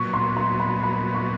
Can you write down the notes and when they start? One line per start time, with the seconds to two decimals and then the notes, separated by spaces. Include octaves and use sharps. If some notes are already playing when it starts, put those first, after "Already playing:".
Already playing: A#2 F#3 B3 C#6
0.14 C6
0.37 C6
0.60 B5
0.83 B5
1.15 C#6